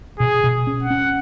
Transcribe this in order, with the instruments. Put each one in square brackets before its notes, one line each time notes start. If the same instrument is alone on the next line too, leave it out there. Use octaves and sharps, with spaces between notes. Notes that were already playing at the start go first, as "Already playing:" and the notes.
[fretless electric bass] B2 [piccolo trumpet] G#4
[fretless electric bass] B2
C#4
[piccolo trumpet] F#5
[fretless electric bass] C#4